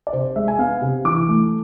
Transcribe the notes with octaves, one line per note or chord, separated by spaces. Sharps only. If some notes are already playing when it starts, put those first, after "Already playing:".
D5
C3 C5
G#3 E5
G#5
B3 F5
C3
E3 D6
A3